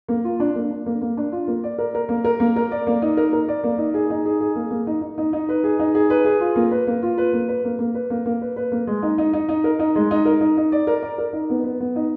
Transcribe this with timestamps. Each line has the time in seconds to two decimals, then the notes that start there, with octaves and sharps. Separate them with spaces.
0.09 A#3
0.24 F4
0.40 D4
0.56 A#3
0.71 D4
0.86 A#3
1.01 A#3
1.17 D4
1.32 F4
1.48 A#3
1.64 D5
1.78 A#4
1.95 A#4
2.09 A#3
2.24 A#4
2.40 A#3
2.56 A#4
2.72 D5
2.87 A#3
3.02 D#4
3.17 A#4
3.33 A#4
3.48 D5
3.64 A#3
3.78 D#4
3.94 G#4
4.10 D#4
4.25 G#4
4.41 G#4
4.55 A#3
4.71 A#3
4.87 D#4
5.01 D#4
5.18 D#4
5.33 D#4
5.49 B4
5.64 G#4
5.79 D#4
5.95 G#4
6.10 B4
6.25 G#4
6.41 F4
6.56 A#3
6.71 B4
6.87 A#3
7.03 F4
7.18 B4
7.33 A#3
7.48 B4
7.65 A#3
7.79 A#3
7.95 B4
8.10 A#3
8.26 A#3
8.41 B4
8.56 B4
8.72 A#3
8.87 G#3
9.03 D#4
9.18 D#4
9.33 D#4
9.49 D#4
9.64 A#4
9.79 D#4
9.96 G#3
10.11 D#4
10.25 A#4
10.41 D#4
10.57 D#4
10.72 D5
10.87 A#4
11.02 D5
11.18 A#4
11.33 D#4
11.50 B3
11.64 B3
11.80 B3
11.96 D#4